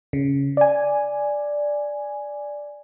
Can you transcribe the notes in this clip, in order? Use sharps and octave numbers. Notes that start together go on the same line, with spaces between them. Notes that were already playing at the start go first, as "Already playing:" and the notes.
C#3
D5 G#5